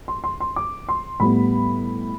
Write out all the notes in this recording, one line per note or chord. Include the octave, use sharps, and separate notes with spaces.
C6
C6
C6
D6
C6
A2 G3 B3 B5